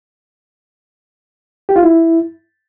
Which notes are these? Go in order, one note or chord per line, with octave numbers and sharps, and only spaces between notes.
G4
F4
E4